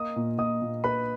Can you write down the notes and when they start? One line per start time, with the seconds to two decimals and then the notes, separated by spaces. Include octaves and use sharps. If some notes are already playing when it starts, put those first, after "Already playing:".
Already playing: A#3 D#5 D#6
0.16 A#2
0.38 A#2 D#5 D#6
0.62 A#2
0.84 A#2 B4 B5